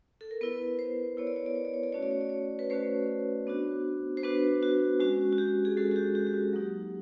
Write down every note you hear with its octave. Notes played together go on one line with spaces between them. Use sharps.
A4
A#4
B3 E4 B4
C5
B3 E4 C#5
D5
C#5
D5
C#5
D5
C#5
D5
A3 C#4 F#4 C#5
D5
C#5
D5
C#5
B4
A3 C#4 F#4 C5
B3 D4 F#4
C5
B3 D4 F#4 B4
F#4
G#3 C#4 F#4
F#4
G4
G#4
G#3 C#4 F#4 A4
F#4
G4
G4
G4
F#4
F#3 A#3 D#4 G4